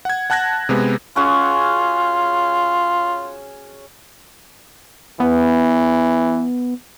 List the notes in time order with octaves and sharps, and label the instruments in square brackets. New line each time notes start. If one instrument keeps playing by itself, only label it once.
[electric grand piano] F#5 G#6
F#5 A5 F#6 G#6 A#6
C3 G#3 B3
[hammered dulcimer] C#4 F#4 G#4 [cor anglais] F4
[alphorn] E3 [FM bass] B3